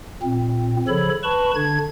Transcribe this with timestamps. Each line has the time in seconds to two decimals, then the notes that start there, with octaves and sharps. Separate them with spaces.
0.23 A#2 C4
0.88 C#3 F3 A4 C#5 B5
1.23 B4 A5 B5 C#6
1.55 D3 D4 G#6